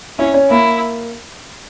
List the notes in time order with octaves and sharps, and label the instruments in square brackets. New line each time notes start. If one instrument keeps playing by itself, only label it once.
[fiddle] C#4 [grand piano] E4
[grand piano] C#4
[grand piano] A#3 [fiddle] E4